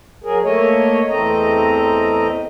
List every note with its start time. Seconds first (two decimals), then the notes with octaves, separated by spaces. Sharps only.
0.24 F#3 G#4 A#4
0.44 A3 A#3 C#5 D#5
1.09 E2 A3 C4 D#5 A#5